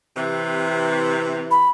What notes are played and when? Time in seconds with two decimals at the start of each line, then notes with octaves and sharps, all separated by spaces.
0.17 C3 E3
1.51 B5